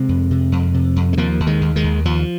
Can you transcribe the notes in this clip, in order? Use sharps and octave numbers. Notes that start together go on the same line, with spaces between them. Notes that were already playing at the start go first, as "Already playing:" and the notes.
Already playing: C3 G#3 C4
F2
C3
F2
C3
F2
G#3
D#2 F3 A#3
D#2
D#3 G#3
D#2
D#3 G#3
D#2
D#2 F3